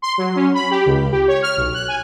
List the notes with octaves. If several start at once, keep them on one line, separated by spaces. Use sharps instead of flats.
C6
F#3
C#4
B5
G4
C#2
G4
C#5
F6
B1
F#6
G#5